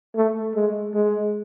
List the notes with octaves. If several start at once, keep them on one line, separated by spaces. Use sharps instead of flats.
A3
G#3
G#3